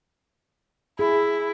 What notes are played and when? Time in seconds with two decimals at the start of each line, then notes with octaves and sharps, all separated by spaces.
0.99 E4 G#4